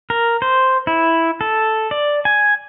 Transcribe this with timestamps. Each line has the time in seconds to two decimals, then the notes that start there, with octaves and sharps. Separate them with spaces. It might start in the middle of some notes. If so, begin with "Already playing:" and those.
0.10 A#4
0.42 C5
0.87 E4
1.41 A4
1.91 D5
2.25 G#5